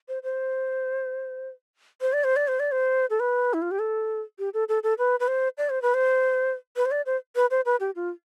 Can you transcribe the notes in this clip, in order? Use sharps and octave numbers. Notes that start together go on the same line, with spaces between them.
C5
C5
C5
D5
C5
D5
C5
D5
C5
A4
B4
E4
F4
G4
A4
G4
A4
A4
A4
B4
B4
C5
D5
C5
B4
C5
B4
C5
D5
C5
B4
C5
B4
G4
F4